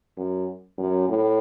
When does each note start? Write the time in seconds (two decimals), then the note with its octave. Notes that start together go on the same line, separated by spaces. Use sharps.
0.17 F#2
0.78 F#2
1.09 A2